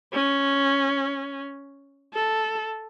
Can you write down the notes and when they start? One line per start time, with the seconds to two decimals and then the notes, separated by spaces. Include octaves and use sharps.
0.13 C#4
2.14 A4